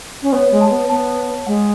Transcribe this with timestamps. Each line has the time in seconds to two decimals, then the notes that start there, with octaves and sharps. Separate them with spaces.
0.22 C#4
0.33 B3 C#5
0.52 G#3
0.61 A5
0.70 B3
0.89 B3 A5
1.46 G#3 F#5